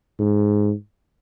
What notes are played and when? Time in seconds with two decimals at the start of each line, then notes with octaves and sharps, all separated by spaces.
0.19 G#2